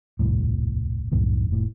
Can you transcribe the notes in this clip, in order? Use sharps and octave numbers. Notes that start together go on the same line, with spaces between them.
D#1 C2 F2 A2
C2 F#2 A2 D#3
F1 A2